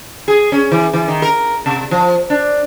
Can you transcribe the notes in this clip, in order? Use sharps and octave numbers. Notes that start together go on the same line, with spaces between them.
G#4
C#4
E3
E3
D#3
A#4
C3
F3
D4